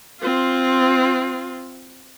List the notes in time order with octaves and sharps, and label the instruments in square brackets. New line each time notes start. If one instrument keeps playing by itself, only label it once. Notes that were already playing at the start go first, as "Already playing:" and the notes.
[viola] C4 F4